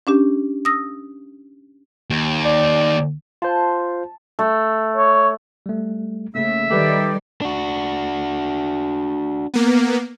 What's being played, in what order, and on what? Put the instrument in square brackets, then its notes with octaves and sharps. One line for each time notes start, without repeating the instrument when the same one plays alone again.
[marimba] C#4 D4 G4
D#6 E6 A#6
[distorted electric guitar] D#2
[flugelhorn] D5
[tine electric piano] F4 C5 [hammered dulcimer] A5
[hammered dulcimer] A3
[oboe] C#5
[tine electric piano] G3 A3
[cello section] C#3 [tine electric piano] A3 A#3 [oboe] E5
[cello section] D#3 G3 D5 [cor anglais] G4 [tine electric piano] A4 B4
[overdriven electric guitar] D4 F#4
[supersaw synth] A#3 B3